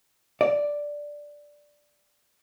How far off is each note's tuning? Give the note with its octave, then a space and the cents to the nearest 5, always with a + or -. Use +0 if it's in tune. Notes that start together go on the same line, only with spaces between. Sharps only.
D5 +0